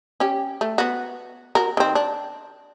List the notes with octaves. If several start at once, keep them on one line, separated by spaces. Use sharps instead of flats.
C#4 G4
A3
B3 F#4
F#4 A#4
D#3 C4
D4